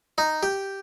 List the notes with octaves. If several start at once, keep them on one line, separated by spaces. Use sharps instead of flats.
D#4
G4